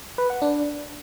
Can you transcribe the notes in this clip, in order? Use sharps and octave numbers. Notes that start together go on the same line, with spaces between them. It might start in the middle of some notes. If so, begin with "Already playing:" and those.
B4
F#5
D4